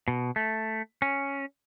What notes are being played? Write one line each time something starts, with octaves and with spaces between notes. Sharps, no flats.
B2
A3
C#4